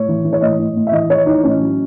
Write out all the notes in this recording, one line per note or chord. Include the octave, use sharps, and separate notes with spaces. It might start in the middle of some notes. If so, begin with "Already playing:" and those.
Already playing: A2 C#5
E3
E3
C#5
A2 D#5
A2
A2
E5
E3 D#5
E3 C#5
E3 D#4
A2 C#4
F#3